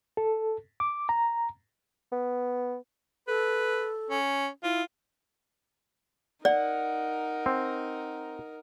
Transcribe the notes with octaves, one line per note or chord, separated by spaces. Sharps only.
A4
D6
A#5
B3
A4 B4
C#4
E4 F4
D#4 A#4 D5 F#5
C4